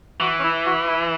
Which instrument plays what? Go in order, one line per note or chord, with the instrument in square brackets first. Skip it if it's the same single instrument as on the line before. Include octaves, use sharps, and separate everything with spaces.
[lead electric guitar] E3 [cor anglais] F#4
[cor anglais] C#4
E4
F#4
E4